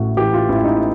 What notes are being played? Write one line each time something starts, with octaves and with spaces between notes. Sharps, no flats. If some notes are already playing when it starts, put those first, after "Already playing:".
Already playing: A1 A2 F#4
E3 G4
F4
A1 E4
D#4